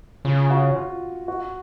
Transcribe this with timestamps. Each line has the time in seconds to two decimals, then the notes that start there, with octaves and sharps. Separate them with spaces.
0.25 C#3 F4
0.50 F#4
0.76 F4
1.28 F#4